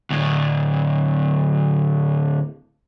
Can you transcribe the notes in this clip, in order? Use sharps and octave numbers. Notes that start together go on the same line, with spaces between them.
D2 A2